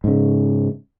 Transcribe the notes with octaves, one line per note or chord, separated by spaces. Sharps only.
G#2 C#3